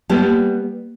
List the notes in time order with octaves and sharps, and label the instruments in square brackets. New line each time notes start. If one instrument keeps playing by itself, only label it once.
[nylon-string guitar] G3 B3 [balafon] A#3